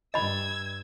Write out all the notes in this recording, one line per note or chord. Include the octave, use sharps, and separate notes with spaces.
G2 D#5 B5 E6 G#6